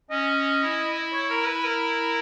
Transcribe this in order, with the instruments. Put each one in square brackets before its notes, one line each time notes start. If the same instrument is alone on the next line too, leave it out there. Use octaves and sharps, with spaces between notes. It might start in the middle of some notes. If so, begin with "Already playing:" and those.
[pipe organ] C#4 [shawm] D#5
[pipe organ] E4
[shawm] C#5
A#4
B4
A#4